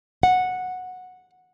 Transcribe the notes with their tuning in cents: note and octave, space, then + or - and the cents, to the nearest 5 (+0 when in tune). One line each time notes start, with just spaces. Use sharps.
F#5 -10